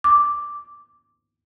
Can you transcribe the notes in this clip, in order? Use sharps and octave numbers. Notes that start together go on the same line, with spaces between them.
D6